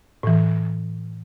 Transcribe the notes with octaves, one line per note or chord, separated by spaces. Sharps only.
A2 E3